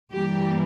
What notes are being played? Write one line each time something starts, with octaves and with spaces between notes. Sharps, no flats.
G2 E3 G3 A#3 G4